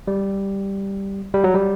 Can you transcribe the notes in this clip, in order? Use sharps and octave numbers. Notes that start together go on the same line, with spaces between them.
G3
G3
F#3
G3